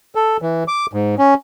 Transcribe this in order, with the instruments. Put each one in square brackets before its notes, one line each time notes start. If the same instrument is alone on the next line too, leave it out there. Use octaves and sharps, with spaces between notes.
[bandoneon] A4
E3
D6
G#2
C#4